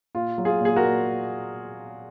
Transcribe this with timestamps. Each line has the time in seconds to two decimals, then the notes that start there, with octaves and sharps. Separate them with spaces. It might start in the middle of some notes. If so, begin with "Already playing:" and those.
0.15 A#2 F4
0.38 F#3
0.45 F4 G#4
0.61 A#2 G#4
0.76 F#4 A#4
0.84 A#2